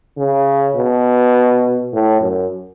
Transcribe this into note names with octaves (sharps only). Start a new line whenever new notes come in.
C#3
B2
A2
F#2